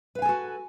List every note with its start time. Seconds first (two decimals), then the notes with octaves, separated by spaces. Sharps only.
0.15 B4
0.19 F5
0.22 G#5
0.25 A4
0.29 F#4